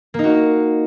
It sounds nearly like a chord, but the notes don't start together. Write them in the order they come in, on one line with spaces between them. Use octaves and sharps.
A#3 D#4 F#4